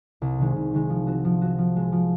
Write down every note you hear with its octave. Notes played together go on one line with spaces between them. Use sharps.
C2
C3 D#3 G#3
C2
C3 D#3 G#3
F3
C4 F#4
F3
C4 F#4
F3
G#3 C4
F3